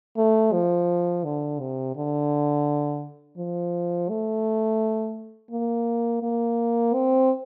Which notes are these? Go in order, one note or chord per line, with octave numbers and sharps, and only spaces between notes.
A3
F3
D3
C3
D3
F3
A3
A#3
A#3
C4